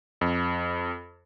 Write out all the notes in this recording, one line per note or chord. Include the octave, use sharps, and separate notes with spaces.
F2